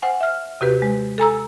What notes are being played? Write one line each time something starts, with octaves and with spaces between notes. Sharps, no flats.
C5 F#5 G#5
E5 F6
D#2 C3 F#4 G4 B4
G#3
A4 G#5 A#5 E6